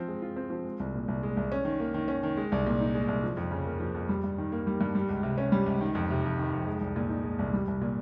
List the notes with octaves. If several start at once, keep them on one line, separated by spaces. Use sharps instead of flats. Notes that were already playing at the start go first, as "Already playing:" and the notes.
Already playing: F3 C4
G#3
F4
C4
F3
G#3
C2
A#2
C2
G#3
C2
C#4
D#3
A#3
D#3
C#4
D#3
G#3
C2
A#2
D#4
G#3
C2
F3
F2
C#3
A#3
F3
F2
G3
G2
D#3
A#3
G3
G2
G3
C#2
C3
C#4
G3
C#2
D#3
F2
C3
F2
D#3
F2
G#3
C2
A#2
D#4
G#3
C2
G3
C2
A#2